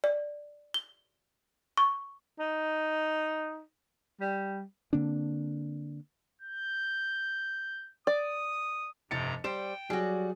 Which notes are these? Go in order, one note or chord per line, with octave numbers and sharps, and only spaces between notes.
D5
G7
C#6
D#4
G3
D3 A#3 C4 D4
G6
D5 D#6
F1 G2 C3 A#5 A6 C#7
G3 C5 G5 E7
F#3 G3 F#4 G#4